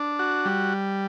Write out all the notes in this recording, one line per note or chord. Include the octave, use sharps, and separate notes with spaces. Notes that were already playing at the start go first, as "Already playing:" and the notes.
Already playing: D4
F#4
G3